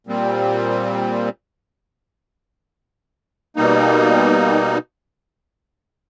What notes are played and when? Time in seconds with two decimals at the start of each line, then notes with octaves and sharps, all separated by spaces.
0.07 A#2 G3 C4
3.56 B2 G3 A#3 D#4